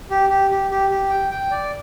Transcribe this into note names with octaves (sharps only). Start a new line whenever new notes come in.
G4
G4
G4
G4
G4
G5
G5
D5